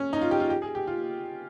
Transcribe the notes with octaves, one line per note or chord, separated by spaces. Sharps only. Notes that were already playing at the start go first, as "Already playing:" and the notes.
Already playing: C#4
D#4
F4
G4
F4
G4
G#4
G4
F4